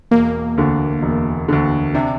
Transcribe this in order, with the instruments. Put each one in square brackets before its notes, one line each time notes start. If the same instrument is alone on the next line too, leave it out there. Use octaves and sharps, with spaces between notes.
[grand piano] E1 [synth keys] A#3
[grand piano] D2 D3
E1
D2 D3
[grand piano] C3 [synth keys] D4